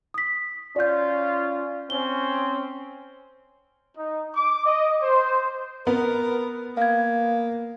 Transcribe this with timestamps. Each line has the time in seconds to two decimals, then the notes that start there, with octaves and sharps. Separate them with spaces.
0.14 D#6 B6
0.76 C#4 F4 D5 G6
1.90 C4 C#4 G7
3.98 D#4
4.35 D6
4.65 D#5
5.02 C5
5.87 B3 A#4
6.77 A#3 F5 G#6